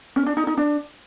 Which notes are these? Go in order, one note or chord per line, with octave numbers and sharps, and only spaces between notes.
C#4
D4
D#4
D#4
D4